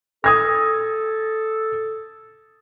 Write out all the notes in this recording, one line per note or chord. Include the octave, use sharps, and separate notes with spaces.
A4 D#6 G#6 A#6